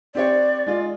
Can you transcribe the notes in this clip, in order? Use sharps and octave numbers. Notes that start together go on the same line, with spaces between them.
C4 G4 C#5 D5
G#3 F4